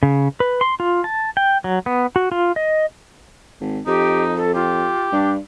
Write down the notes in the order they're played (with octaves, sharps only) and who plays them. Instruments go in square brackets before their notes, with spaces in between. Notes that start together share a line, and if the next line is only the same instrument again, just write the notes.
[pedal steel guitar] C#3
B4
C6
F4
A5
G5
F#3
B3
F#4
F4
D#5
[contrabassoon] G#1
[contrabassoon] F2 [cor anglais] D#4 [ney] G4
[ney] A4
[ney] F4 [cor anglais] G4
[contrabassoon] G2 [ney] D4